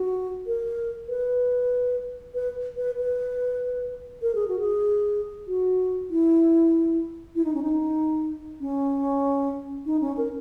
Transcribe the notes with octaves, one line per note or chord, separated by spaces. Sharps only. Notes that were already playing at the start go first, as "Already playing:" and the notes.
Already playing: F#4
A#4
B4
B4
B4
B4
A#4
G#4
F#4
G#4
F#4
E4
E4
D#4
C#4
D#4
C#4
D#4
C#4
A#4